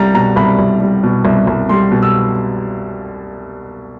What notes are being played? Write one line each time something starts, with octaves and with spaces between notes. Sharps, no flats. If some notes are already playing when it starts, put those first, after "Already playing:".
Already playing: C2 G3 A#5
B2 A#5
C2 B5
C2
G3
B2
C2
C2
G3 C6
B2
E6